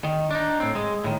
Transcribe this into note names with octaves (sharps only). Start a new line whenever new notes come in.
D#3
D4 D#4
A2 C4
G#3
A2 D#3